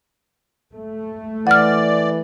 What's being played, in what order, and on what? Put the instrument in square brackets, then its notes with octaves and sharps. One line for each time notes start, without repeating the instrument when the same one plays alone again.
[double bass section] A3
[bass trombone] E3 [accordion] D5 [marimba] F#5 F6